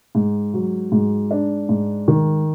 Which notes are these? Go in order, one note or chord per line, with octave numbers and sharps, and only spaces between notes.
G#2
F#3
G#2
D4
G#2
D#3